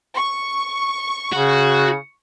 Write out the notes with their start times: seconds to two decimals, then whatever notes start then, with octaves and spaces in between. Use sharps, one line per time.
0.14 C#6
1.33 C#3 F#4